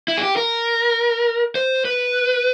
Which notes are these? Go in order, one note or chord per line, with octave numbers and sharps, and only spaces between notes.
E4
G#4
G4
A#4
C5
B4